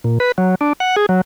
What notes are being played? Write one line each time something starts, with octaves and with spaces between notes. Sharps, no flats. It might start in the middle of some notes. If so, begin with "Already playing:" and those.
A#2
B4
F#3
D4
F#5
G#4
F#3